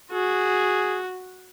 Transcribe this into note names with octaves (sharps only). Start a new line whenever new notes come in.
F#4 G#4